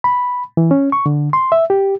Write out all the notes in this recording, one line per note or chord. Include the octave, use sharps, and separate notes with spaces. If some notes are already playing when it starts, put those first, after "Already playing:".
B5
E3
C#4
C#6
D3
C6
E5
G4